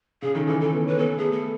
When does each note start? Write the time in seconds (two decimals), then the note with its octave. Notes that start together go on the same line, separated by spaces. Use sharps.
0.22 C#3 G#4
0.34 D#3 A4
0.47 E3 A4
0.60 D#3 A4
0.73 B3
0.85 C#4 B4
0.99 B3 A4
1.17 A3 G#4
1.32 A4